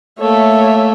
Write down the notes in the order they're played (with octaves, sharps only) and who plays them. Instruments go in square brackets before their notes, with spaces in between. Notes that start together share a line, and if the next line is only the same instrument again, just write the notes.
[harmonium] A3 A#3 A4 [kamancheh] C#5 E5